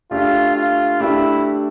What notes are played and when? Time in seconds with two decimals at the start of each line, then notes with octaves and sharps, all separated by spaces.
0.11 A3 D4 F4 G4
0.56 F4
1.00 A3 D4 E4 G4